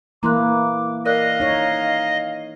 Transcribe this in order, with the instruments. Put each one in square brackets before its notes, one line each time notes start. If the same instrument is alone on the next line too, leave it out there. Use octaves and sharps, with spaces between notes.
[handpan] E3 A#3 E4 [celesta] A#5 C6 F#6 [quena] D6
[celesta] A#4 D5 F#6 [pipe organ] D#5 [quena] F5
[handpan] D#4 C#5